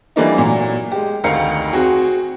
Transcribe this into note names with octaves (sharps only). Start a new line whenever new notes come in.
E3 G3 A3 A#3 D4 D#4
A#2 F#3
G#3 G4
F1 D2 D#3 A#4 F5 C#7
C4 F#4 G#4